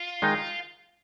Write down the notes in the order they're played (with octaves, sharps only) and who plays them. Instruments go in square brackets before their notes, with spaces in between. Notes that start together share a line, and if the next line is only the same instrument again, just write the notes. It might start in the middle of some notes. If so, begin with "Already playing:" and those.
Already playing: [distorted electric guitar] F4
[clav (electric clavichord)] D#3 G#3 D#4